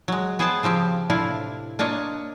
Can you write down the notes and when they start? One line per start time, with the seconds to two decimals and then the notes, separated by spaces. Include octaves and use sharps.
0.08 F#3 G#3
0.39 B3 G#4 B4 C5 G5 A5
0.63 C#3 F3 C4 G4
1.10 A2 C3 D4 E4 F4 F5
1.79 A#3 D4 F4 C#5 D#5